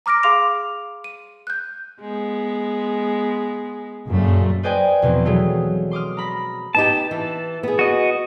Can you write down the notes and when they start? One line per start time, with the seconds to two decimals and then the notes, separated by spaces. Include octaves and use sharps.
0.06 A#5 D6 F6 A#6 D7
0.23 G#4 F5 C6 D6 F7
1.04 D#7
1.47 F#6 G6
2.00 G#3 B3
4.09 F#2 A#2 C#3 A3
4.63 B4 C5 D5 D#5 G5 G#5
5.02 E2 B2 F3 C4
5.25 E3 F#3 G#3 A3
5.91 C6 D6 D#6 F6
6.17 A#5 B5 A#6
6.75 B3 D#4 G4 A5
7.11 E3
7.63 B3 G#4
7.79 F#4 D#5